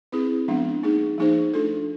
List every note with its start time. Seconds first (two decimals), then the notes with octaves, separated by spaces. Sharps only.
0.12 C4 E4 G#4 B4
0.48 F3 G#3 B3 D4
0.83 A#3 D#4 G#4
1.18 F3 A#3 D#4 G#4 C5
1.54 A3 D4 F4 A4